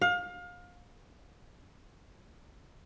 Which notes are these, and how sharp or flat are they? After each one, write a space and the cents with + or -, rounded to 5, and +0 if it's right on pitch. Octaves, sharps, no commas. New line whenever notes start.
F5 +30